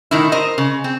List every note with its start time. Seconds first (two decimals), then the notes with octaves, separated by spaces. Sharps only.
0.11 A2 D#3 E4
0.32 A#4 C5 D#5
0.58 C#3
0.84 C4